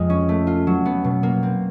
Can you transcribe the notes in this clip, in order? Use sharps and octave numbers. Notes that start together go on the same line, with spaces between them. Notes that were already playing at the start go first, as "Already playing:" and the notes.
Already playing: F2 G#3
C#4
A3
F4
F#3
B3
B2
A#3
C4